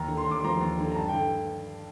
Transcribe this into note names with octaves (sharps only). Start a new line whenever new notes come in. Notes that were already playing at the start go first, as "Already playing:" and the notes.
Already playing: D#2 A#5
D3
C6
D#2 D6
C6
F3 A#5
D#2
D3
A#5
G2 A5
D3 G5